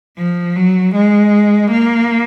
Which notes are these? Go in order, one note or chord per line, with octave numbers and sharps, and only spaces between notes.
F3
F#3
G#3
A#3